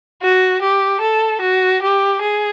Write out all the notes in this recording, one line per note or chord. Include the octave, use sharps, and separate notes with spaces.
F#4
G4
A4
F#4
G4
G#4